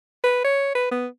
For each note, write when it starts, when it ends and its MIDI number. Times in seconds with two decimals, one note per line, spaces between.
0.24 0.44 71
0.44 0.74 73
0.75 0.89 71
0.91 1.07 59